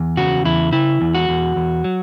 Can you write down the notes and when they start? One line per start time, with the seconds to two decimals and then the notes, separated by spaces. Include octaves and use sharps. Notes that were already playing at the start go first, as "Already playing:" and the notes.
Already playing: E2
0.17 C#3 F#4
0.45 E2 E4
0.73 C#3 E4
1.01 E2
1.15 F#4
1.29 E2
1.56 E2
1.84 F#3